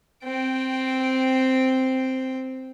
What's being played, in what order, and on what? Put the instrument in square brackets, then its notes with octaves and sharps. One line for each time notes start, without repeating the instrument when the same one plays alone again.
[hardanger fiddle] C4 G5